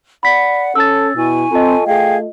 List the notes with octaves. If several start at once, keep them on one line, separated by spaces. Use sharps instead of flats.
D5 F#5 B5 B6
C#4 A4 E6 A6
B2 E4 G#5 C#6
C4 F4 A4 D#5
A3 G#4 F5 G5 G#6